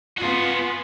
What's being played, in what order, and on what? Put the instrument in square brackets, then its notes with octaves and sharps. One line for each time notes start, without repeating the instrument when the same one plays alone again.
[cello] B3 F4 [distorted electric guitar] F#4 G#4